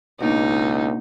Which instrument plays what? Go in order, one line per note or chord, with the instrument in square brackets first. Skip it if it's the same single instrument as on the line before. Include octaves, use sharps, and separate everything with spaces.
[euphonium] C#2 [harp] B2 A#3 D4 [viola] D#4